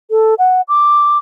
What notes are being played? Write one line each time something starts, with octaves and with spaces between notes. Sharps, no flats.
A4
F#5
D6